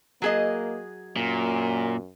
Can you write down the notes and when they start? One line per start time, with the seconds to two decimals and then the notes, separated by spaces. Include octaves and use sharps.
0.22 F#3 A#3 G#4 D#5
1.16 F#2 A#2